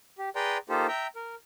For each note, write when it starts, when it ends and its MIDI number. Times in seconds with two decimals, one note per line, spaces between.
0.18 0.29 67
0.36 0.58 68
0.36 0.58 71
0.36 0.58 74
0.36 0.58 79
0.36 0.58 82
0.36 0.58 84
0.69 0.87 58
0.69 0.87 63
0.69 0.87 65
0.69 0.87 67
0.69 0.87 69
0.69 0.87 72
0.88 1.07 76
0.88 1.07 79
0.88 1.07 82
1.16 1.35 70